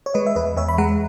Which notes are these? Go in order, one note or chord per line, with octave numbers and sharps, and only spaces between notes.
C#5
G#3 B4 D#5
E5
E2 B4 D#5
E2 C#5 E5
B5
G#3 F#5 A#5